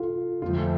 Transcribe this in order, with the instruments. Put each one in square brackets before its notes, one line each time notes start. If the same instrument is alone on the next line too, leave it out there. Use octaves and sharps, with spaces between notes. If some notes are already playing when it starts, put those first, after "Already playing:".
Already playing: [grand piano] F4 A4
[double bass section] F2 D3 F3 A3 [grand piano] F4